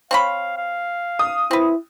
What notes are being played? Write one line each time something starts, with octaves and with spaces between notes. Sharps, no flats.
C4 C#5 F5 B5
F5
D#6
C4 E4 B4